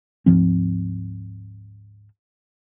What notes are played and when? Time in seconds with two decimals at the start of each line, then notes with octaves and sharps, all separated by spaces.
0.26 D2 G#2 F3 C4